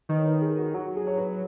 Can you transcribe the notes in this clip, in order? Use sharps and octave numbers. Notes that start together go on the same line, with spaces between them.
D#3 B4
C#5
B4
G#4
F#4
F#3 F#4
G#4
C#5
B4